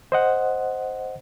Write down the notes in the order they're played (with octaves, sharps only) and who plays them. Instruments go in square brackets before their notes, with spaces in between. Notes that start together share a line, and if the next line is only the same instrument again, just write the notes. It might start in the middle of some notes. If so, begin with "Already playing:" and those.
[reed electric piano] C5 D#5 F#5